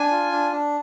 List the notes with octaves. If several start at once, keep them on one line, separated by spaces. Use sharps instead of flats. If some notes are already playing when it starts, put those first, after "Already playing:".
Already playing: D4 G#5
F4
D4
D4